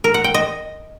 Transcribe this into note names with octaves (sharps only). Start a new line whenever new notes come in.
A#4
F#5
G5
D#5